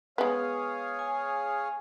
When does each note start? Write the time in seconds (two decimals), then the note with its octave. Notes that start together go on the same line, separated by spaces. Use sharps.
0.18 G#3 B3 G#4 C#5 F5
0.99 G#5